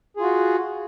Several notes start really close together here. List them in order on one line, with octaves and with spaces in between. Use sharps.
G#4 F4 F#4